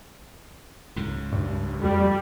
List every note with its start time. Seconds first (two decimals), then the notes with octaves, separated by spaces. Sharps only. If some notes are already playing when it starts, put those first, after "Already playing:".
0.96 C#2 G#2 C#3
1.33 G2
1.82 F2 G3